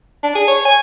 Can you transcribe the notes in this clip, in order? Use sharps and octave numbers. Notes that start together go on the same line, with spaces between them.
D4
G#4
C#5
G#5